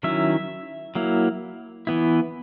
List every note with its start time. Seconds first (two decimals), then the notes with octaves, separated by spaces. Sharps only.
0.03 D#3 F#3 C#4 E4 E5
0.95 F#3 A#3 E4
1.87 E3 B3 E4